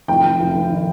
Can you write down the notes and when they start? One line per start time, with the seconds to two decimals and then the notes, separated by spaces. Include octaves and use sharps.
0.08 F1 G5
0.24 F1
0.40 F1
0.55 F1
0.70 D#3